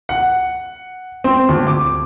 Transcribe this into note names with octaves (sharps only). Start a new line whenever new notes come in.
F#5
C4
D2
D6